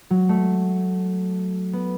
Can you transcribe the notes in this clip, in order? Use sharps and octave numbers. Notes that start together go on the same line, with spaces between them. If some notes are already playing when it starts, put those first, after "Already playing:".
F#3
A3
B3